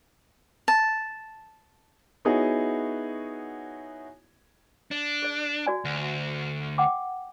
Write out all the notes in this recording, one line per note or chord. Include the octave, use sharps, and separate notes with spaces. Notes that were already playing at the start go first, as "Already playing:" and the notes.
A5
B3 D#4 E4 F#4 G#4 C#5
D4
G#4 D5
F#4 D5 G#5
D2
F#5 G5 D6